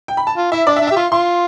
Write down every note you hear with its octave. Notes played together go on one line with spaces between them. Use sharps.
G5
B5
A5
F4
E4 E5
D4 D5
E5
D4
E5
G4
F4 C6
F4 C6